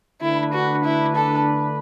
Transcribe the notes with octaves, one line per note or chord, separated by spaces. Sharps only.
D3 A3 D4 E4 B4
F#4
E4
A4